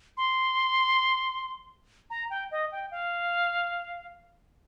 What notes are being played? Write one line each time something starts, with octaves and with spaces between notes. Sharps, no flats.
C6
A#5
G5
D#5
G5
F5